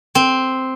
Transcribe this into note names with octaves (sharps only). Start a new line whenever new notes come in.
C4